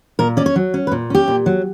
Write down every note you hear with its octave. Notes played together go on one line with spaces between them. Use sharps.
A#2 A#4
C#4 D5
C#5
F#3
C#4
B4
A#2
C#4 G4
A#2
F#3